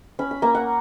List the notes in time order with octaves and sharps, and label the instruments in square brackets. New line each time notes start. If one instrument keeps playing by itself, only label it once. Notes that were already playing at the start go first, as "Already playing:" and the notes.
[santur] C#4 B5
B5
A#3 A#5
F#5